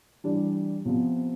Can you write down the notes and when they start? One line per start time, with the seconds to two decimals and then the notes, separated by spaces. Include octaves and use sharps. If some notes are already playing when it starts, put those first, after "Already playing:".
0.24 E3 G3 D4
0.85 C3 F3 B3